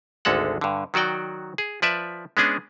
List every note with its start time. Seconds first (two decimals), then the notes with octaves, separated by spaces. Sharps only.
0.25 G#1 D2 D3 G#3 A4 F#5
0.61 G2 D3
0.94 D#3 F#3 F#4 D5 G5
1.58 G#4
1.82 F3 B4 D5 E5
2.37 G#3 B3 C#4 D4 G#4